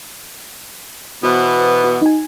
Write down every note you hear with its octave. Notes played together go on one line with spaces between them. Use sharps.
B2 E3 B3 F#4 C5
F#4
D#4 G#5